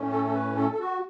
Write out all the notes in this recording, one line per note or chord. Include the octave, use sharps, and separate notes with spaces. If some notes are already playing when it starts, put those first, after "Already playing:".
Already playing: A2 A3 C#4
A4
A4
B4
A4
A4
F#4